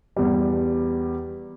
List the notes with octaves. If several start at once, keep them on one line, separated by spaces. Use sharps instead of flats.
E2 G3